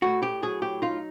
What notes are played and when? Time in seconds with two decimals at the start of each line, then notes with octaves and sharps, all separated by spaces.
0.02 A2 F#4
0.23 G4
0.42 F#3 G#4
0.62 G4
0.82 D#4 F4